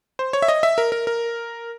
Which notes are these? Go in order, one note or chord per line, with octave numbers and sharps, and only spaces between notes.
C5
C#5
E5
D#5
E5
A#4
A#4
A#4